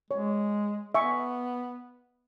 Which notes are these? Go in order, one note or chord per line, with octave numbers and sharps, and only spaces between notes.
G#3 C#5
B3 E5 G#5 C#6